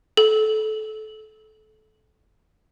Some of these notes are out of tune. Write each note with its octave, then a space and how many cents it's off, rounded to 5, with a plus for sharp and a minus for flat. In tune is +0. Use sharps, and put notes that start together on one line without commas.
A4 -25